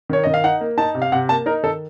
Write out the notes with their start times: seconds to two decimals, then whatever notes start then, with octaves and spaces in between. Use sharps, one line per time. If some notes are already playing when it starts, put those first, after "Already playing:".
0.09 D#3 C#5
0.24 D#3 D#5
0.34 F5
0.44 D#4 F#5
0.61 A#3
0.78 D#4 A5
0.95 C3
1.02 F5
1.12 C3 F#5
1.29 A#3 A5
1.46 D#4 A#4
1.63 D#3 A4